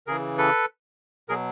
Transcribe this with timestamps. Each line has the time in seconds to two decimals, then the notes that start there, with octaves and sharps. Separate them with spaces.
0.07 C#3 E3 G#4 A#4
0.38 A4 B4
1.29 B2 F#3 G#4 A#4